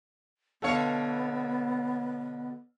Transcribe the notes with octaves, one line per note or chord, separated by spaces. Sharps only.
B2 D3 B3 A4 C#5 F5